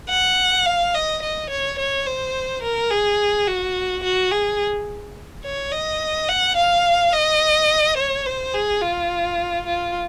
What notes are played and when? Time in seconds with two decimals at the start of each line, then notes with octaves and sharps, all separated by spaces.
0.10 F#5
0.66 F5
0.95 D#5
1.23 D#5
1.50 C#5
1.79 C#5
2.07 C5
2.63 A#4
2.91 G#4
3.47 F#4
4.04 F#4
4.32 G#4
5.45 C#5
5.72 D#5
6.29 F#5
6.57 F5
7.13 D#5
7.98 C#5
8.26 C5
8.55 G#4
8.82 F4
9.67 F4